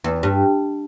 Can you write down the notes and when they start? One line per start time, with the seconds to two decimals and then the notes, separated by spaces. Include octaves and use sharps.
0.04 E2
0.23 G2